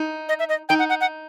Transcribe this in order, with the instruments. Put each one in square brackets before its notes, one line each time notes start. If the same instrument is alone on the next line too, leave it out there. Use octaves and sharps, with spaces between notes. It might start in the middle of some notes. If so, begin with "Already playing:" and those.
Already playing: [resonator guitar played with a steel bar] D#4
[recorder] D#5
E5
D#5
[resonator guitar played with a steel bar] D#4 [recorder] G5
[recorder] F#5
F#5
F#5